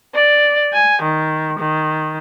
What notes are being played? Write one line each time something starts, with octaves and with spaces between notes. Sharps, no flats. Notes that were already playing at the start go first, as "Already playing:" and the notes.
D5
G#5
D#3
D#3